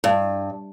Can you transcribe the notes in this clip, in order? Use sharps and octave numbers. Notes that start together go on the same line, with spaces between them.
G2